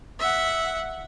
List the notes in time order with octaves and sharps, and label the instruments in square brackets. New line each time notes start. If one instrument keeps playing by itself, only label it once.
[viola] E5 F#5